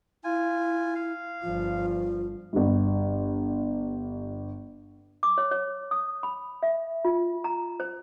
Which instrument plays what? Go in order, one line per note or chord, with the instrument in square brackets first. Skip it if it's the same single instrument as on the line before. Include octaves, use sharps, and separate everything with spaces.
[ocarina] E4 [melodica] F4 G#5
[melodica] F5
[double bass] G1 F3 [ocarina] F4
[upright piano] G1 G2
[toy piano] D6
C#5
C#5
D#6
B5
E5
F4
A#5
C5